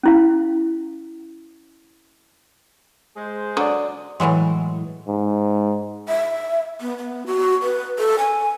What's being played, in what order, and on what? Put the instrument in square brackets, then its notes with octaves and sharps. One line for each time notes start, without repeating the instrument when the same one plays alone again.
[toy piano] C#4 E4 F5
[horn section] G#3 G#4 C5
[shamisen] D3 F#3 [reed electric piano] D5 D#6
[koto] A2 E3 F#3 G#3
[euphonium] G#2
[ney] E5
B3
B3
F#4
B4
A4
G#5